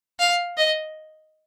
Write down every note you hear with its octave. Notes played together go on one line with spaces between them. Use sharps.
F5
D#5